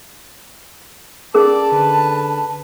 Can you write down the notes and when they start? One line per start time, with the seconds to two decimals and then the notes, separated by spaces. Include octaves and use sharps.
1.34 C#4 G#4 A#4 D5 A5
1.72 D3 B4